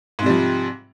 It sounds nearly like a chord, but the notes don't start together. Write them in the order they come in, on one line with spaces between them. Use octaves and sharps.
G#2 C3 G3 F3